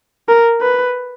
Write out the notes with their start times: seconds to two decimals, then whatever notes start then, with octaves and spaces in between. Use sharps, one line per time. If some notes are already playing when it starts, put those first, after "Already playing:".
0.29 A#4
0.62 B4